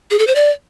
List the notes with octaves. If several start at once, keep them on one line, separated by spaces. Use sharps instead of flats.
G#4
A4
C5
D5